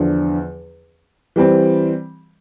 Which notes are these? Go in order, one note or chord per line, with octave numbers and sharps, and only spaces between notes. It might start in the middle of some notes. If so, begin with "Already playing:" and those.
Already playing: E2 D3 F3
E3 G3 C4